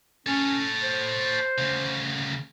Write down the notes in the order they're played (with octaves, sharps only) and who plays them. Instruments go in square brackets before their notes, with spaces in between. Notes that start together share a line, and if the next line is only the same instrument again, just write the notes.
[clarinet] C#4 [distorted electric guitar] A4 C#5
[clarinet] C5
[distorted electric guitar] D2 C#3